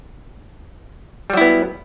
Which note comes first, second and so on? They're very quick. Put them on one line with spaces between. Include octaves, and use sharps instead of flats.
G3 F#3 E4 B3